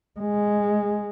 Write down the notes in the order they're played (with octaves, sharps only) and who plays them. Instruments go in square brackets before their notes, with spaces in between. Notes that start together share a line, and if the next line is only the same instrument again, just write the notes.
[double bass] G#3